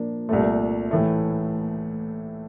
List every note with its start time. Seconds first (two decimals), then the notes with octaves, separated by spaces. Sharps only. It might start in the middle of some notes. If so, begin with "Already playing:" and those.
Already playing: A#2 F3 A#3 D4
0.29 C2 A#2 A3
0.91 A2 E3 A3